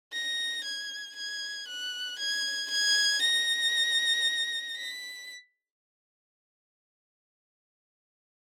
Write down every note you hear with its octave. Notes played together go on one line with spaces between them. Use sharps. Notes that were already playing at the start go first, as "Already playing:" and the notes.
A#6
G#6
G#6
F#6
G#6
G#6
A#6
B6